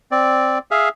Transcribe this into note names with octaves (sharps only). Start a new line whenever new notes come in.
C4 D5
G#4 E5 F5